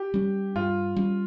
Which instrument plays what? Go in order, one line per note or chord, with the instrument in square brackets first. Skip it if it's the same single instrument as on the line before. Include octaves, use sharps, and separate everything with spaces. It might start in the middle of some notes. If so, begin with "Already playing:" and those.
Already playing: [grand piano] G4
[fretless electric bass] G3 C#4
[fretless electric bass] G2 [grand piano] F4
[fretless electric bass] G3 C#4